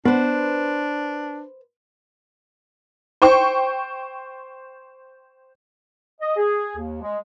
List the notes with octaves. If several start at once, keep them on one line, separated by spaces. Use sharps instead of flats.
B3 D4 B4 C5
C5 G5 C#6
D#5
G#4
D#2
G#3